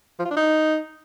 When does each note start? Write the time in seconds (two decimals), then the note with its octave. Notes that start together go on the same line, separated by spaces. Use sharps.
0.19 F3
0.25 F4
0.31 D4
0.36 D#4